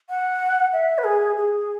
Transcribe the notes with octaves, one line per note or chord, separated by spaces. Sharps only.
F#5
E5
B4
G#4
G#4